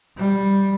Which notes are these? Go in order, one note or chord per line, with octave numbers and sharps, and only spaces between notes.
G3